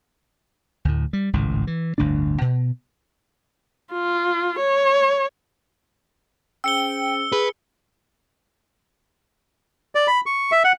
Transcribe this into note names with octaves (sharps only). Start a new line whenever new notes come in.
D2 A2
G3
G#1 C#2 A2
E3
G1 D2 A2 D4
B2
F4
C#5
C#4 G#4 C5 G5 E6 C#7 G7
G#4 B4
D5
B5
C#6
E5
F#5